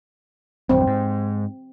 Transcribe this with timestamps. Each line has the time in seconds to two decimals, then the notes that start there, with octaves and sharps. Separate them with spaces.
0.69 B1 E2 G2 C4
0.87 G#2